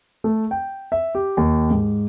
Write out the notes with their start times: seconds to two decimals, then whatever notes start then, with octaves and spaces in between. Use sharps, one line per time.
0.24 A3
0.51 G5
0.92 E5
1.15 G4
1.37 D#2
1.71 G#2